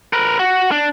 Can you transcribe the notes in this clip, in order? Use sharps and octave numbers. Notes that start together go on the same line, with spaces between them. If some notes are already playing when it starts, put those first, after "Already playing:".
A#4 B4
F#4
D4